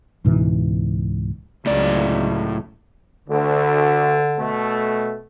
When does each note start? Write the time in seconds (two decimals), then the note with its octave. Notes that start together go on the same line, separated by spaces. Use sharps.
0.24 C#2 G#2 B2 E3
1.66 C#2 A2 F#3 D5
3.28 D2 D3
4.37 B2 A3